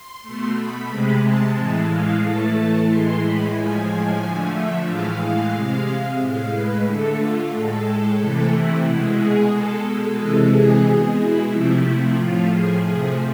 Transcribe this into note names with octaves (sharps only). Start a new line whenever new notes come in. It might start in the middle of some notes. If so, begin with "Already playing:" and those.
Already playing: C6
B2 A3
B5
C3 G#3
A5
A2 E3 G#3
F5
A2 E3 A3 A5
A2 E3 G#3 C6
B5
A2 F3 G#3 G#5
G#5
D3 F3 A3
E5
A2 E3 G#3 F5
C3 G#3
A2 G#3 F5
B4
D3 A3 A4
F4
A2 G#3 A4
C3 E3 A3 A4
E4
B2 G#3 E4
G#4
B2 G#3 A4
A4
C3 E3 G#3 A4
G#4
B2 G#3
E4
C3 F3 A3 E4
A2 F3 A3 F4
G#4
C3 F3 A3 G#4